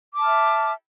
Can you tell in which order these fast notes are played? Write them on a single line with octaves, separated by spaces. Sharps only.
D6 A5 F6 E5